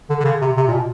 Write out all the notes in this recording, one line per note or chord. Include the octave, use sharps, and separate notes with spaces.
D3
D3
C#3
C3
C3
A#2
B2